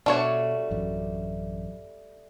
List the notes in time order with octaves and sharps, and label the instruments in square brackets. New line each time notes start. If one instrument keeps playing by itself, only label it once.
[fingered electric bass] B2 [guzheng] G3 A3 [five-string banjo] D4 F#4 C#5
[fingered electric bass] A1 F#2